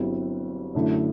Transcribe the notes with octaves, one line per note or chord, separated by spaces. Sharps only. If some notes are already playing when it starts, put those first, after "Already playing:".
Already playing: G1 G2 F#3 C4 E4
F#2 D3 A3 E4